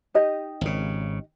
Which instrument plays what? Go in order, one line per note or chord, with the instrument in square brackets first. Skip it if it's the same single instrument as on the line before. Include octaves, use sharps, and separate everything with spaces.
[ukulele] D#4 G4 D#5
[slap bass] G#1 C#3